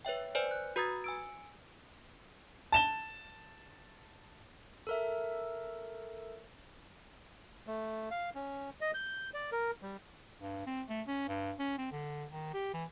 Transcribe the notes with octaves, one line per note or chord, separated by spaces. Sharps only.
B4 C#5 E5 G5
B4 C5 D5 G#5
F#6
F#4 B4 A#5 D#6 G#6 A6
G#5 E6 D7
A5 E7 G7
A4 A#4 E5
A3
F5
C#4
D#5
G6
D5
A#4
G3
G2
C4
A3
C#4
G2
C#4
C4
D3
D#3
G4
E3